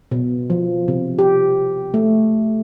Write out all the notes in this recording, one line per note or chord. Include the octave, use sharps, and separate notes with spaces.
B2
F3
C3
G4
A3